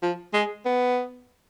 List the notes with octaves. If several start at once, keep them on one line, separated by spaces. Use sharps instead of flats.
F3
G#3
B3